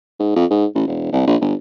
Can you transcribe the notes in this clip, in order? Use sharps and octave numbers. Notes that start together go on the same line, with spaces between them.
G#2
F2
G#2
A1
E1
C2
A#1
G1